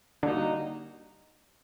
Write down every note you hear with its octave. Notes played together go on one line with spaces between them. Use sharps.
D3 G3 A#3 D#4 F#4